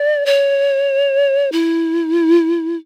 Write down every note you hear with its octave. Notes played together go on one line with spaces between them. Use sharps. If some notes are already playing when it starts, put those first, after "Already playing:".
Already playing: D5
C#5
E4